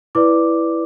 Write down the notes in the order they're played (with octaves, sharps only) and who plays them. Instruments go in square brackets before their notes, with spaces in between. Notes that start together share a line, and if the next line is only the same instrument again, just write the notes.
[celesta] E4 B4 D5 D6